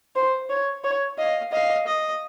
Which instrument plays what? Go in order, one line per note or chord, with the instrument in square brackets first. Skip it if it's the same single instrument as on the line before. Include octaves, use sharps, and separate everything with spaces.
[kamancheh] C5
C#5
C#5
[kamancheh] D#5 [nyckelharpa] F5
[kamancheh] D#5 [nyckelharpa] F5
[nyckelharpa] D#5